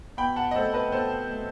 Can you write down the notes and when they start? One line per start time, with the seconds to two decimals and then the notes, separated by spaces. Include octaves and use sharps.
0.17 B2 G5 B5
0.36 F#5 A5
0.51 D#5
0.55 A3 C4 A4 C5
0.74 B4 D#5
0.92 B2 A4 C5
1.30 A3 C4